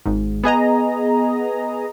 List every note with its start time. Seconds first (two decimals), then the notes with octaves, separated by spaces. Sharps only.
0.06 G#1 G#2
0.43 B3 G#4 D#5 A#5